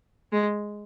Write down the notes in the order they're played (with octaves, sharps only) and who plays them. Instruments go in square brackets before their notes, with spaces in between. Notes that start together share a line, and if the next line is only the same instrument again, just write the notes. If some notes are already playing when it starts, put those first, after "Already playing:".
[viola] G#3